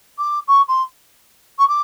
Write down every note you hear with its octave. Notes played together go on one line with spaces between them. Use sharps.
D6
C#6
C6
C#6
D6